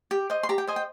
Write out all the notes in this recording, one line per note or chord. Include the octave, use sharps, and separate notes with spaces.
G4
C5 D#5
C6
G4 A#5
G5
C5 D#5 G#5
G5